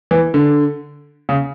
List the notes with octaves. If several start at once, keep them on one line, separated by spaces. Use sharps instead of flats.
E3
D3
C#3